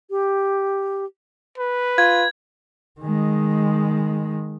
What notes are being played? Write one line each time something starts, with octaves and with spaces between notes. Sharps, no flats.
G4
B4
F4 G#6
D#3 G#3